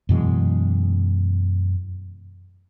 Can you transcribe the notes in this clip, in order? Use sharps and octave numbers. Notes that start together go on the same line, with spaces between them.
F#2 B2 E3 G#3